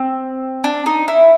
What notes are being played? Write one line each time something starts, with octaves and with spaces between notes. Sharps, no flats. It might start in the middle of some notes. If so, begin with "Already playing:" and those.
Already playing: C4
D4
D#4
E4